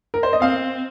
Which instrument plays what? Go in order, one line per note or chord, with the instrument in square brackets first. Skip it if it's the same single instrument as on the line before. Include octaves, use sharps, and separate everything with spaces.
[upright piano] A#4
C5
D#5
[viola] C4 [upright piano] F5